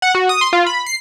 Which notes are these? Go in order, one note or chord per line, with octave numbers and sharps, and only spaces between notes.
F#5
F#4
D#6
C6
F4
B5
C7